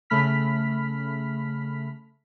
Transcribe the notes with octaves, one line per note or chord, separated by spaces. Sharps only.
C#3 A3 B5 F6 B6